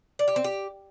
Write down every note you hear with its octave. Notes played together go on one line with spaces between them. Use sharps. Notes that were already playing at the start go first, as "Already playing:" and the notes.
D5
G4
C4
G4